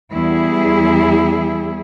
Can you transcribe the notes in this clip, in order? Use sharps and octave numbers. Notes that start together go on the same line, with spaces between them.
E2 G3 E4 G#4